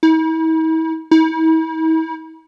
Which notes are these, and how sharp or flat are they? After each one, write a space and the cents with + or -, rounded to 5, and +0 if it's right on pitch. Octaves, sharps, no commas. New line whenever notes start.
E4 -45
E4 -45